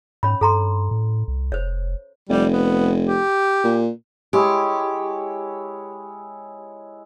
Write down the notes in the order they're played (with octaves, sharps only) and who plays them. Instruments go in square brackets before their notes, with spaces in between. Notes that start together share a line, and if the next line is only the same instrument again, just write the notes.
[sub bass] G#2 [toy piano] C#4 C#5 B5
[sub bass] G2 [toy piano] A4 A#5 C6
[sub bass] A2
C2
[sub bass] F1 [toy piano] C5 C#5
[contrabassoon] F1 [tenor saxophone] G3
[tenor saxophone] B3
G4
[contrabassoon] A#2
[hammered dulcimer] G#3 E4 C#5 [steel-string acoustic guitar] G4